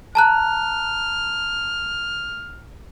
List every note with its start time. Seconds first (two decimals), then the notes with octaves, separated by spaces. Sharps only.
0.15 A5 A#5 F6 F#6